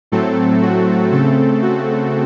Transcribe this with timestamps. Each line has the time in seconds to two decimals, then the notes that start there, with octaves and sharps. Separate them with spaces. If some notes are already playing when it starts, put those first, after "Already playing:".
0.12 A2 F#3 A3 C4 A4
0.62 F#4
1.12 C#3 A3 C4 A4
1.62 F#4